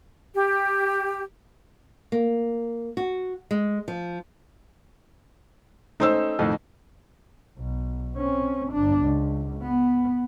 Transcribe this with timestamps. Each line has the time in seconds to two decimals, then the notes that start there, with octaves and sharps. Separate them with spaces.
0.35 G4
2.12 A#3
2.97 F#4
3.51 G#3
3.88 F3
6.00 A3 C#4 D#4 C5 E6
6.39 F2 A2 D#3
7.58 B1
8.15 C4 C#4
8.72 G1 D4
9.03 C#2
9.62 B3